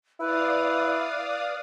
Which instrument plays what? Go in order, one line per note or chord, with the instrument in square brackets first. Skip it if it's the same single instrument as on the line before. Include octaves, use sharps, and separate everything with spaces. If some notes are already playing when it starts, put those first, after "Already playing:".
[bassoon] E4 [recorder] B4 [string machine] D5 F5 D#6